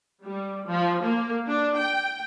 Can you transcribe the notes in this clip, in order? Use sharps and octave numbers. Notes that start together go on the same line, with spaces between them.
G3
F3
A#3
D4
G5